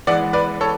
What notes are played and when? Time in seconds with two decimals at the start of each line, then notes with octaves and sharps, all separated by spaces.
0.07 E3 G#3 B3 D5 F#5
0.33 B4 D5
0.61 A4 C#5